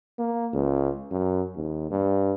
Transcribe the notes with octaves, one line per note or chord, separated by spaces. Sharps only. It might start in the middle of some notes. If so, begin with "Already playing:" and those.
A#3
C#2
F#2
D#2
G2